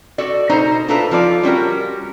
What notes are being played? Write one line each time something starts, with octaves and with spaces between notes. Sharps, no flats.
F#4 A4 D5
B2 D#4 C5 A#5
D4 E4 F4 A4 B4 A#5
F3 F4 D5
G3 C#4 F#4 A#4